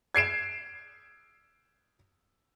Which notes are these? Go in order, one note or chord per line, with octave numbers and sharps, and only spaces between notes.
G#6 C7 D7 E7